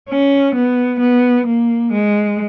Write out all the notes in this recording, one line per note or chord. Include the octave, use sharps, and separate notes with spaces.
C#4
B3
B3
A#3
G#3